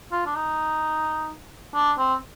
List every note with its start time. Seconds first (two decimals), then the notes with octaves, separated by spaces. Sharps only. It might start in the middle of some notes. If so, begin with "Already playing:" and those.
0.12 F4
0.26 D4
0.36 D#4
1.75 D4
1.98 C4